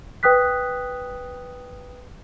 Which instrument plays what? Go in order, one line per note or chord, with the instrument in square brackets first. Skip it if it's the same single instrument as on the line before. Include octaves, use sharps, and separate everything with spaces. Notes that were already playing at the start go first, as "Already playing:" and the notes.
[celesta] B4 G5 D#6 F#6 B6